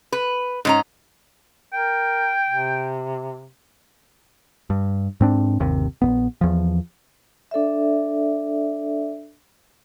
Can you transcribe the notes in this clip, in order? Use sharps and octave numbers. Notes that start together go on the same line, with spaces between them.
B4
G#2 C#4 A#5
A#4 G5
C3
G2
G#2 C4 D4
G1 D#2 C3
A#1 E2 B3
E2 F3
D4 A4 D5 E5